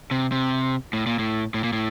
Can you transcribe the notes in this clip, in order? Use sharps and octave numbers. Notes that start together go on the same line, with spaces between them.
C3
C3
A2
A#2
A2
A2
A#2
A2